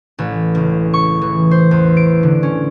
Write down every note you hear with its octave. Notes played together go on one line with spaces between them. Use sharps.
A1
C#2
C#6
E3
C5
E2
D7
D3
C#4